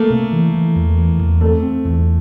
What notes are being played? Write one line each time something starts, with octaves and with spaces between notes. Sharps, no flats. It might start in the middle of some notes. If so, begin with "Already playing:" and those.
Already playing: A3 A#3
C3
E3
E3
E2
E3
E2
A3 C4
C4
E2